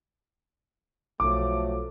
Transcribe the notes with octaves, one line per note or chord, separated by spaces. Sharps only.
B1 F3 F#3 A3 D6